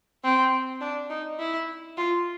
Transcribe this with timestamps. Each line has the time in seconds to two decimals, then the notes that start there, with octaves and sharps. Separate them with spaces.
0.24 C4
0.81 D4
1.10 D#4
1.39 E4
1.97 F4